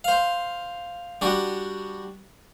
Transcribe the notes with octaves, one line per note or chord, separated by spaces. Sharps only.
C5 F5
G3 D4 F#4